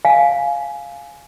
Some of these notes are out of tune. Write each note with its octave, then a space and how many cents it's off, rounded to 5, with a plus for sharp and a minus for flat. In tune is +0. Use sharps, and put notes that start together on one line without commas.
F5 +0 G#5 +15